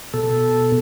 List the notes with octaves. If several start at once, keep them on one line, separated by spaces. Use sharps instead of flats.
B2 A4